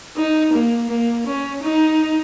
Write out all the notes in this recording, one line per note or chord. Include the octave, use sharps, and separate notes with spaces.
D#4
A#3
A#3
C#4
D#4